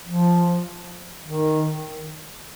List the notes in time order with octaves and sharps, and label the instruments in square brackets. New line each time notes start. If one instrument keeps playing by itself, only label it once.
[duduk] F3
D#3